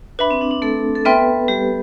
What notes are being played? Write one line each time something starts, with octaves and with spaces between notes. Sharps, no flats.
D4 B4 E5 B5
C4
D4
D4
A3 A4
A4
B3 B4 E5 G5 C6 F6
G3 G4